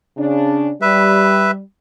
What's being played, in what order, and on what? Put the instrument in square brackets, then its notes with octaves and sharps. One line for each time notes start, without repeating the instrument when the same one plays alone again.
[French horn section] C#3 D4
[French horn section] G3 [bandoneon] B4 E5